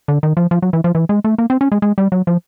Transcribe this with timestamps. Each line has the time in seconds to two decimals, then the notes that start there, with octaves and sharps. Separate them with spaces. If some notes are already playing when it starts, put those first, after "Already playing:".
0.08 D3
0.23 D#3
0.37 F3
0.51 F3
0.62 F#3
0.73 E3
0.84 F3
0.95 E3
1.09 G#3
1.24 A3
1.38 A#3
1.50 C4
1.61 C#4
1.72 G#3
1.82 G#3
1.98 G3
2.12 F#3
2.27 F3